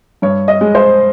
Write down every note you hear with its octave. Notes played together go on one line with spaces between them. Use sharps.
G2 C#5
D#5
G#3
C5